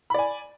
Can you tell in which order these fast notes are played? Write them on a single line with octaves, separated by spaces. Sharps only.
B5 D5 G#5